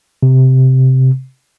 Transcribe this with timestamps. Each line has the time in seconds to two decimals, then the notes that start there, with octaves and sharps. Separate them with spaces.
0.23 C3